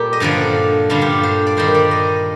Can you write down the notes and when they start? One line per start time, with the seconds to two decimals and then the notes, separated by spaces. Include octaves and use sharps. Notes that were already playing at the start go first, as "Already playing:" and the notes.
Already playing: A#2 G3 G4 A4
0.13 D#5
0.20 G2 D3 F3 D5
0.90 G2 D3 G3 F4
1.02 G4
1.23 C5
1.47 D5
1.57 G2 D#3 G3 C5
1.74 D5
1.91 D#5